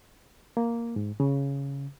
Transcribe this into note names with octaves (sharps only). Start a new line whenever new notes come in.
A#3
G#2
C#3